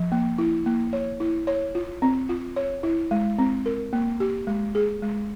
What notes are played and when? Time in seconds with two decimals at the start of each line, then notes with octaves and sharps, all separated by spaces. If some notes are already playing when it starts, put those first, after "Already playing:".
Already playing: F3
0.12 A#3
0.38 E4
0.66 A#3
0.93 C#5
1.20 E4
1.47 C#5
1.75 F4
2.02 C4
2.29 F4
2.56 C#5
2.83 E4
3.11 G#3
3.39 C4
3.66 A#4
3.93 A#3
4.20 G4
4.47 G#3
4.75 G#4
5.02 G#3